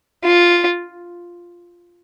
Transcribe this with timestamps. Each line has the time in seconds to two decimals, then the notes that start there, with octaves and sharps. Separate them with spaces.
0.23 F4